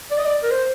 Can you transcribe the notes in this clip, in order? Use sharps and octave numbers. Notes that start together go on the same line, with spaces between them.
D5
D#5
D5
A#4
C5